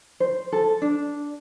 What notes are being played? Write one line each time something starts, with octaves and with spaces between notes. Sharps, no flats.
C5
A4
D4